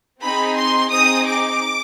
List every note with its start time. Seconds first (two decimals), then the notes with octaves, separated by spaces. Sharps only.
0.22 C4 D#4 G#4 B5
0.56 C6
0.90 C4 D#4 G#4 D#6
1.25 D6